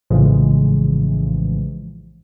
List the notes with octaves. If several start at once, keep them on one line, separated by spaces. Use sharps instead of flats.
A#1 A2 C#3 E3 F3 G#3